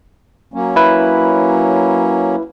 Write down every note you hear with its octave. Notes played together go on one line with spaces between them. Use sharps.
F#3 A#3 C#4
E4 B4